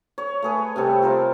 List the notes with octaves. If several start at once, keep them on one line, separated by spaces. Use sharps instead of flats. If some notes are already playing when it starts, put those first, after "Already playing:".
C#5
A3 G#4 B4
C3 G3 A4
F4 A#4 C5